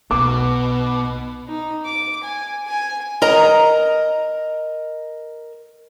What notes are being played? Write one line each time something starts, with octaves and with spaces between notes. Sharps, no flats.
B1 B2 D6
D#4
D6
G#5
G#5
A#4 D#5 A#5